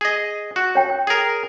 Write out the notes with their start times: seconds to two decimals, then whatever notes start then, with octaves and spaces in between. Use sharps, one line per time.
0.01 G#4 D#5
0.56 F#4
0.75 C#5 G5
1.07 G#4 A#4